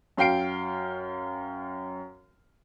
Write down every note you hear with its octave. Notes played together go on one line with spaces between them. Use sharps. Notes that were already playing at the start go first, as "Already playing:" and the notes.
F#2 F5 G5 C7 D7